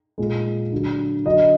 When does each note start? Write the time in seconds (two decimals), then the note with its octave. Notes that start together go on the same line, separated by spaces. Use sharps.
0.18 A#2 G#3
0.72 D3 F#3
1.25 D3 F#3 D#5